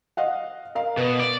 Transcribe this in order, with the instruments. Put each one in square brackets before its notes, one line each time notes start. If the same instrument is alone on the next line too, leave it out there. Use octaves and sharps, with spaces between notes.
[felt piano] D#5 F5 F#5
A#4 F5
[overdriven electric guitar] B2 [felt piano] B4 D#6
[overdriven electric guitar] D5